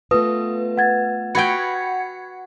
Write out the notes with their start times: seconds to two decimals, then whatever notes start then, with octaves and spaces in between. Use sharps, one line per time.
0.11 A3 B3 F4 B4 D#6
0.77 F#5 G#6 A6
1.35 F#4 B4 F#5 G5 B5 G#6 C#7